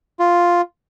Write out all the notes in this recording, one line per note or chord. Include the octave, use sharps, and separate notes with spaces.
F4